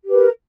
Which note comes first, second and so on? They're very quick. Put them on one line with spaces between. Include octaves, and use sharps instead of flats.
G4 B4 A#4